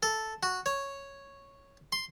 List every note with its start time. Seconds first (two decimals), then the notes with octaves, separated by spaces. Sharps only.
0.03 A4
0.43 F#4
0.66 C#5
1.92 C6